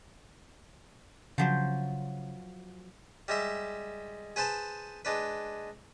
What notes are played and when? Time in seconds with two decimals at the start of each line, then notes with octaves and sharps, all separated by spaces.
1.38 C#3 F3 F#3 C5
3.28 G3 G#3 E5
4.36 G#4 B4 C5 G#5 A5
5.05 G#3 D4 B4